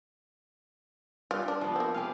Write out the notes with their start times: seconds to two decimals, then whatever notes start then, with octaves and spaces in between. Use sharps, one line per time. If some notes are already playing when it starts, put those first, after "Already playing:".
1.31 G2 F4
1.48 D4
1.61 F3 B3
1.76 A#3 C4
1.94 G4 G#4 F5